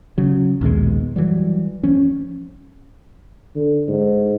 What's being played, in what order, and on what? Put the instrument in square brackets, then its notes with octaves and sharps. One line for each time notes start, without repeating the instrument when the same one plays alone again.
[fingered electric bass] C#3 F#3
A#1 D#2 B2 G#3
E3 F#3 G3
F3 C#4
[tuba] D3
G#2